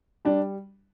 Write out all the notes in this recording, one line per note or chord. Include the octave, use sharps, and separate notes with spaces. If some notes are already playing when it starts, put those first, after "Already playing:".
G3 D4